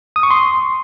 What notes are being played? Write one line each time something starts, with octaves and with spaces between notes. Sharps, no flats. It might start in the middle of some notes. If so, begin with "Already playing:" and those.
D#6
C#6
C6